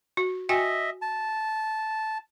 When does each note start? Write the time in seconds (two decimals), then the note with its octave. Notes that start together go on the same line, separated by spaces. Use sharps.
0.17 F#4
0.49 F#4 D#5 E5 G5 G#5
1.02 A5